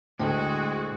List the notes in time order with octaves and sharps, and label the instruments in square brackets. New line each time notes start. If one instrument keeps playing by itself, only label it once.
[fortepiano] D2 [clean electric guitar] A2 [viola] G#3 F#4 [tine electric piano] A4 D#5 G5